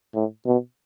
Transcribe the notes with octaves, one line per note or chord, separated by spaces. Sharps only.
A2
B2